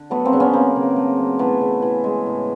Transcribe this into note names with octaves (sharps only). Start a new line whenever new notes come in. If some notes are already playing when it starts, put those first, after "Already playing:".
Already playing: D3
F#3 A3 B3
A#3 C4
C#3 D4
B3 C#4
F#3 A#3 C4
C#3
A3
F#3
E3 A3 B3
C#3
E3
G#3
A2